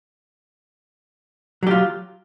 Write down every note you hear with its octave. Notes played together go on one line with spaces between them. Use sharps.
F#3 F4 G4